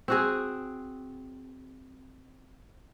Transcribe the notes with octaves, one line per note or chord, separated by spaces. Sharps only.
C4 F#4 G#4